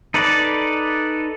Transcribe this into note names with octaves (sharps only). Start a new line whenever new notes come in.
D#4 A4 B4 D5